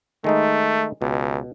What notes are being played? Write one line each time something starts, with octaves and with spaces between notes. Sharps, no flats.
D#3 G#3 A3 D#4
C#2 B2